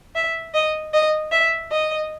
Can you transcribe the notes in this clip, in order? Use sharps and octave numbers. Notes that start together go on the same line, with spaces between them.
E5
D#5
D#5
E5
D#5